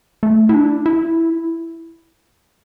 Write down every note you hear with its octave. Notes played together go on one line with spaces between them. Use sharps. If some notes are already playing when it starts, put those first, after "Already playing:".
A3
E4
D4
E4